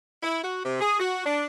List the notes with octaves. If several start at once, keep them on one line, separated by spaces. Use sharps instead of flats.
E4
F#4
C3
G#4
F#4
D4